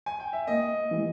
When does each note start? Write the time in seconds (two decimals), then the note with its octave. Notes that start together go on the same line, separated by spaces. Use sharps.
0.06 G#5
0.20 G5
0.33 E5
0.47 A#3 D#5
0.91 E3